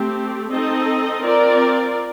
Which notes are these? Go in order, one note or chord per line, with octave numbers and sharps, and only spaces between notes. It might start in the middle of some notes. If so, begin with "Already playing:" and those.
Already playing: A3 C4 G4
C4 D#4 A4 D#5
C4 F4 A#4 D5